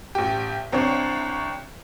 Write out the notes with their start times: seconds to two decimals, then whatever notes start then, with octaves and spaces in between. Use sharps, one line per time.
0.15 A1 G4
0.73 C2 C4 D4 C#5